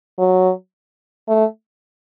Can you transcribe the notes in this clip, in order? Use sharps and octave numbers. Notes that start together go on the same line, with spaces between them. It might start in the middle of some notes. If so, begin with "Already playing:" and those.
F#3
A3